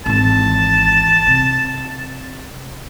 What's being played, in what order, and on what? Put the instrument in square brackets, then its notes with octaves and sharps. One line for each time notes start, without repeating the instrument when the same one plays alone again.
[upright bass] G#1 E3 [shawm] A5
[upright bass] C3